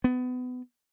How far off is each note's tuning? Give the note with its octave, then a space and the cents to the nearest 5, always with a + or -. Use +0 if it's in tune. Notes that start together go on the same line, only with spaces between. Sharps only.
B3 +25